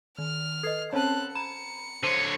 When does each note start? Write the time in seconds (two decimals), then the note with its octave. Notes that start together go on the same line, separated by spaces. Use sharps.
0.18 D#3 F6
0.63 A4 B4 D#5 G#6 C7
0.93 C4 C#4 A4 C5 C#5 A5 F#6
1.35 A#5 B5 C#7 E7
2.03 D3 C5 C#5 C6 C7 D#7